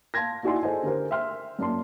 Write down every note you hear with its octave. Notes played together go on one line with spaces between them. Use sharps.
F5 A5 C6 G#6 A#6
D#4 E4 F#4 D5 G#5 C6
G#4 A4 C5 D#5 G#5
D3 G4 A#4 C5
E5 G5 C6 F6
F#2 A#3 D5 A5 C6